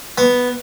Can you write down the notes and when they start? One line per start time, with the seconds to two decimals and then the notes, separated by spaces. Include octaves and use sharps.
0.18 B3